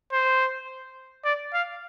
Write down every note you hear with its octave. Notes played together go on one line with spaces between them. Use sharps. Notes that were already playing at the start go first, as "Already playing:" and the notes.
C5
D5
F5